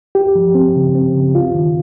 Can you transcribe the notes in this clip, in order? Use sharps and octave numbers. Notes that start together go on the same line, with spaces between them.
G4
F3
C4
C#3
C4
C#3
F4
D#3